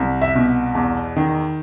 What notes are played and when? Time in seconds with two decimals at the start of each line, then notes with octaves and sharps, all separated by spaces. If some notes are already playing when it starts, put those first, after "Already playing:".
Already playing: C2
0.21 E5
0.35 B2
0.75 E2
1.16 D#3